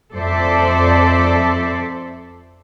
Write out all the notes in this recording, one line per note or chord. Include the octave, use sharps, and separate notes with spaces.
F2 A4 C5 D5 E5